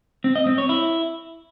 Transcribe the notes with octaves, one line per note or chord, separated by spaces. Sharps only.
C4
D#5
C4
C#5
E4